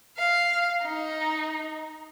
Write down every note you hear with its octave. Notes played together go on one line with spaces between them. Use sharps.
F5
D#4